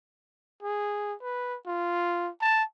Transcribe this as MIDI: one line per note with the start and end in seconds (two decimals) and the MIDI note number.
0.62 1.14 68
1.22 1.56 71
1.67 2.29 65
2.41 2.63 81